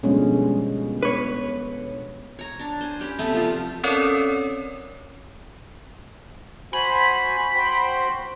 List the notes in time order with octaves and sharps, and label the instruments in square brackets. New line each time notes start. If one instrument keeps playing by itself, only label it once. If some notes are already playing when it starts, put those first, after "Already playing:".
[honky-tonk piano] B2 D3 F3 [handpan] G3 G#3 C#4
[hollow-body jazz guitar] B4 C#5
[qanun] C#5 A#5
D4
C5 G#5
C#4 G4 B5
C3 A3 B3
F3 G3 F4
[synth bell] C4 C#4 A4 A#4 C#5 D5
[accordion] F#4 C5 G#5 [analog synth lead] B5
[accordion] F#4 C5 G5